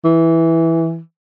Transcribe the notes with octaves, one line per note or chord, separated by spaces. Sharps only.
E3